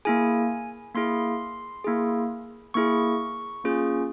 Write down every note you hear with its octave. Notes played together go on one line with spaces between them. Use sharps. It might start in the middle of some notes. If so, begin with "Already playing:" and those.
A#3 E4 G#4 G#5
A#3 E4 G#4 C6
A#3 E4 G#4
A#3 E4 G#4 C#6
A#3 C#4 F4 G#4